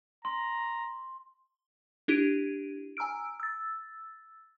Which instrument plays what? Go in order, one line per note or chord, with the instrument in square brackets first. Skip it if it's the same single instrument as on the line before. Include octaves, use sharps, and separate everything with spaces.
[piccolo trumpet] A#5 [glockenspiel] C6
[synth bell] D4 E4 G4 D7 D#7
G#5 A#5 E6 F6 D7
E6 A6